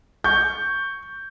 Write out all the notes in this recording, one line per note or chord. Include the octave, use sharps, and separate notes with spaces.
C#6 G6